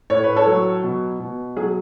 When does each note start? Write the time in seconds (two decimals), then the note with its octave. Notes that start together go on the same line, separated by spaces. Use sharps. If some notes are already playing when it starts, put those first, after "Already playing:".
0.10 A2 C#5
0.24 B4
0.36 A4 C#5
0.47 F#3
0.83 B2
1.20 B2
1.56 F#3 G#4